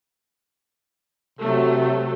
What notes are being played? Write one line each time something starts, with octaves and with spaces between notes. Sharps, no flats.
C3 F#3 A3